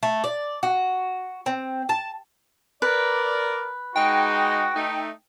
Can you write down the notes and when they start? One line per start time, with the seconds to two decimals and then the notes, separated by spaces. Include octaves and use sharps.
0.03 A3
0.24 D5
0.63 F#4
1.46 C4
1.89 A5
2.82 A#4 B4 D5
3.96 G#3 D#4 F#4 G5
4.75 A3 D#4